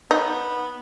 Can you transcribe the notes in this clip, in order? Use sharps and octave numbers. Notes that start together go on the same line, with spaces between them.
B3 D#4